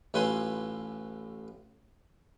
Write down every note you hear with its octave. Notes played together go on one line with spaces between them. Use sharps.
A1 A2 F4 B4 G#5 C6